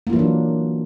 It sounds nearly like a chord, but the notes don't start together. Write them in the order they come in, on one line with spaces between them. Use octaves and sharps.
A#3 F4 E3 F#3 D4